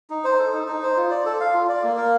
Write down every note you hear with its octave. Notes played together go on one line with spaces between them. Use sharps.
D#4
C5
A4
D#4
D#4
C5
F4
D5
A4
F5
F4
D5
A#3
A#4